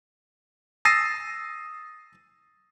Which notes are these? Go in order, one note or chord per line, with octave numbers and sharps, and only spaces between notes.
D#6 E6 A6 A#6 C7 D#7